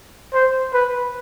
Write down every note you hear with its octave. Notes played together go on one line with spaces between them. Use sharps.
C5
B4